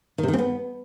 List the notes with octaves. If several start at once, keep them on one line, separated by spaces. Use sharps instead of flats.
D#3
C3
D#3
C4
B3